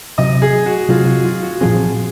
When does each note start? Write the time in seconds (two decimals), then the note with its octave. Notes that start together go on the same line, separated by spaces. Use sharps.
0.18 C3 F#3 C4 D#5
0.42 G#4
0.66 F#4
0.89 C3 F#3 C4 F4
1.07 F#4
1.24 F4
1.43 F#4
1.61 A#2 F3 C4 G#4